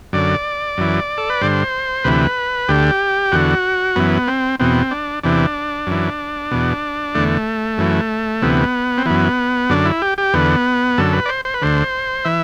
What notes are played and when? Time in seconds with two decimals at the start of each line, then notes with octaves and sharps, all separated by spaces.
0.13 F#2 D3 D5
0.78 F#2 E3
1.18 A4
1.30 B4
1.41 G2 D3 C5
2.04 D2 C3 E3 B4
2.68 D2 D3 G4
3.32 E2 D3 F#4
3.96 F#2 E3 B3
4.28 C4
4.60 E2 B2 C4
4.91 D4
5.23 E2 C3 E3 D4
5.87 F#2 E3
6.51 E2 B2
7.15 E2 D3 A3
7.78 F#2 E3
8.42 D2 C3 E3 B3
8.98 C4
9.06 F#2 E3 B3
9.69 F#2 D3 D4
9.85 E4
10.02 G4
10.18 G4
10.33 E2 D3 B3
10.98 F#2 D3 A4
11.13 B4
11.26 D5
11.29 C5
11.45 C5
11.54 B4
11.62 D2 D3 C5
12.25 E3 E5